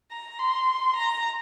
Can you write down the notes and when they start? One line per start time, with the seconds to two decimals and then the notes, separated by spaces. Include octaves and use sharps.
0.11 A#5
0.39 C6
0.95 A#5